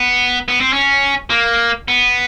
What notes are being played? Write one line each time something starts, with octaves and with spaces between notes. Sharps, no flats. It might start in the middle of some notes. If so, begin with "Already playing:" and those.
Already playing: B3
B3
C4
C#4
A#3
B3